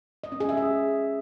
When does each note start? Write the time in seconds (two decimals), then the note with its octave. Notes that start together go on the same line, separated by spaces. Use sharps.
0.24 D#5
0.32 C#4
0.40 G#4
0.49 E5
0.57 G#4